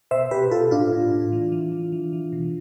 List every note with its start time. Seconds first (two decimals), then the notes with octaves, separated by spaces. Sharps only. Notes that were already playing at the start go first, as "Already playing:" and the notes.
0.11 B2 C5 E5
0.31 B2 G4 B4
0.51 B2 F4 A4
0.71 A2 D4 F4
0.92 A2
1.12 A2
1.32 E3
1.52 E3
1.72 E3
1.92 E3
2.13 E3
2.32 B2